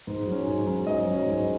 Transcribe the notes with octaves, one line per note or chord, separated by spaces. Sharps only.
G#2
F#3 C#4
G#2
F#3 C#4
G#2 D#5
F#3 C#4
G#2